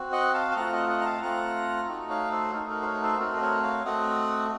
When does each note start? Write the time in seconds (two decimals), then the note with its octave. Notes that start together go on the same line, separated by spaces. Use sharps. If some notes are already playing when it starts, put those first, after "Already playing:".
Already playing: C4 F#4
0.12 D#5 F#5
0.34 F5 A5
0.51 A5
0.56 A3 C4 F4 F#5 A#5
0.72 D#5 F#5
0.89 D#5 F#5
1.01 A#5
1.05 F5 A5
1.22 A3 C4 F4 F#5 A#5
1.88 A3 D#4 F#4
2.10 C#5 F5
2.32 A4 C5
2.54 A3 D#4 F#4 A#4
2.70 A#4
2.82 C5
2.86 A#4 C#5
3.03 A4 C5
3.19 A3 C4 F#4 A#4
3.36 D#5
3.42 A#4 C#5
3.63 C#5 F5
3.85 A3 C4 F#4 D#5 F#5